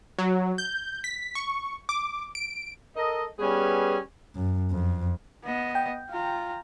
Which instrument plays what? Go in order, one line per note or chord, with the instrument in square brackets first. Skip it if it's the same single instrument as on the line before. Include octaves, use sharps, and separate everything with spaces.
[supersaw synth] F#3
G6
B6
C#6
D6
D7
[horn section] A4 A#4 D#5
G3 B3 C#4 G#4 B4
[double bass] F#2
F2
[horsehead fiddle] B3 D#5
[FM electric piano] G5
[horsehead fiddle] F4 A#5